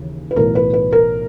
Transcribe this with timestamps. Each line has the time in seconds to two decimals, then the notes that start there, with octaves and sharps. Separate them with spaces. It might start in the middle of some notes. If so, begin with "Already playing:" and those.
Already playing: D#2 C#3 E3
0.31 B4
0.36 B1 A2 E3 A#4
0.55 B4
0.74 B4
0.92 A#4